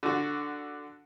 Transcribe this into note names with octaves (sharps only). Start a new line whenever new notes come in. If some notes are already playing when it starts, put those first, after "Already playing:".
D3 F#4